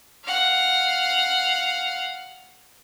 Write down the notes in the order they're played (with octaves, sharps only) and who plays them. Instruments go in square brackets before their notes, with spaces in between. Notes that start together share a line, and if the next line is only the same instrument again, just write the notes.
[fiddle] F5 F#5